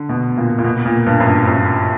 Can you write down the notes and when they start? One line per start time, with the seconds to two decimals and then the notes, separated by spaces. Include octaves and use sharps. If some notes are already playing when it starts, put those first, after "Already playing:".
Already playing: D3
0.09 B2
0.37 A#2
0.58 A#2
0.64 B2
0.86 A#2
1.06 G2
1.20 F#2
1.27 G2
1.47 F#2